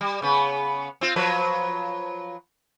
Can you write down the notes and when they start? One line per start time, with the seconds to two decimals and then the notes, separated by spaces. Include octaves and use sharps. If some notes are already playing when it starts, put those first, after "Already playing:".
0.01 G3
0.22 C#3 B3
1.01 C4 F4
1.16 F3 F#3 B4